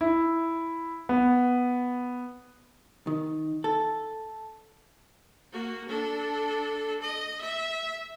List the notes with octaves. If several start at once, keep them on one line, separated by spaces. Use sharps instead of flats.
E4
B3
D#3
A4
A#3 F#4
D4 A4
D#5
E5